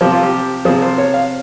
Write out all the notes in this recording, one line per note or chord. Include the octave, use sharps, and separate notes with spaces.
C3 F3 G4
F4
G4
C3 F3 G#4
C5
C#5
F5